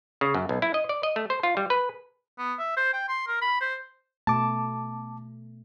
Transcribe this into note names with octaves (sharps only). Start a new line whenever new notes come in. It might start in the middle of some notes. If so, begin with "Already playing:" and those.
C#3
F#2
B1
E4
D#5
D5
D#5
A3
C5
F4
G3
B4
B3
E5
C5
G5
C6
A#4
B5
C5
B2 A3 A5 D6